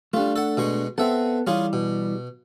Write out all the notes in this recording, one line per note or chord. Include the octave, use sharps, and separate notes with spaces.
G3 A3 D4 F4
A4 F#5
B2 G#3 C#6
B3 C4 A4 E5 F#5
E3 G3 C#4 F4 G#4
B2